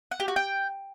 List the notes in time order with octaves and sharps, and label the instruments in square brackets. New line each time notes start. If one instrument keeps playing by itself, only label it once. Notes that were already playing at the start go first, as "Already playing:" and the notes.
[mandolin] F#5
G4
F#4
G5